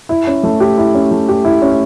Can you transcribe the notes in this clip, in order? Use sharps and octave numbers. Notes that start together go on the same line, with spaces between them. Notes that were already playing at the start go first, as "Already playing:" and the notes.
E4
C#4
A3
G4
E4
C#4
A3
G4
E4
C#4